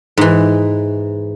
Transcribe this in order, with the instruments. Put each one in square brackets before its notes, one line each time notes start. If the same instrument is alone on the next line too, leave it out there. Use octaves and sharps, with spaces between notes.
[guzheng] G#2 E3